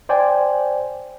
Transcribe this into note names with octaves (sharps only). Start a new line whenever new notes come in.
C5 D5 G5 G#5